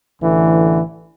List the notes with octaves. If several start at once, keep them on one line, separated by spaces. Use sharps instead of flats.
A1 D3 E3